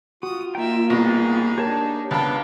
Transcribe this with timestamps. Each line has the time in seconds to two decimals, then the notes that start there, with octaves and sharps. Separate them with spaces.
0.23 F4 F#4 D#6
0.55 A#3 D#4 E5 G5
0.90 C2 B2 D#4 G#4 A#6
1.58 A#3 D4 G4 C#5 A5
2.11 C#2 B3 D4 B4 G5 A5 B5 F6